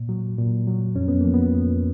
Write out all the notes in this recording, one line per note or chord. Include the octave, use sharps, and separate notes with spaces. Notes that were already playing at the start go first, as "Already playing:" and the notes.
Already playing: A#2
F#3
A#2
F#3
F2 C#4
B3
F3 A#3
B3
F2